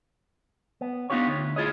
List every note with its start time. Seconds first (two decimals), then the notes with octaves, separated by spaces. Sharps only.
0.81 B3
1.10 B3 D4 D#4 F4 G4 C#5
1.27 D2
1.56 D2 E4 F4 G#4 C#5 D#5